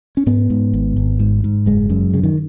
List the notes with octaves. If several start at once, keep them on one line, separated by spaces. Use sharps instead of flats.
C#4
G#2 B3
G#2
G#1
G#1
G#2
G#2
F#1 G#3
F#2
C#3
D#3